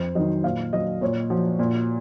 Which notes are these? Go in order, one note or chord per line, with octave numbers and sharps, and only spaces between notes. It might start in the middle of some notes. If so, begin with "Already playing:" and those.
Already playing: F2 C5
D#3 F#3 D#5
A#2 F5
F#3 D#5
A#2 C#5
F3 F#4
A#2